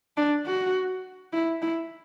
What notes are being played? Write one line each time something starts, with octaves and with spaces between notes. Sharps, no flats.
D4
F#4
E4
E4